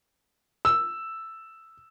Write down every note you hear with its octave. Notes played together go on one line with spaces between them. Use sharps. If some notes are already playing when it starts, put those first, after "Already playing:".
E6